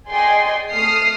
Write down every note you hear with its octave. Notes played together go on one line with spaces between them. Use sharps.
G#4 D5 D#5 G5 G#5 C6
A3 D#6 F6 C7